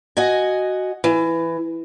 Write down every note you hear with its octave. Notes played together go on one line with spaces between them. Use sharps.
F#4 D#5 G#5
E3